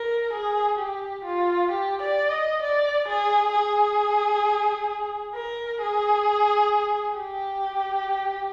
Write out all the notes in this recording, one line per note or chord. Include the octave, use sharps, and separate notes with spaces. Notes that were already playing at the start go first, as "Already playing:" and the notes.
Already playing: A#4
G#4
G4
F4
G4
D5
D#5
D5
G#4
G#4
A#4
G#4
G4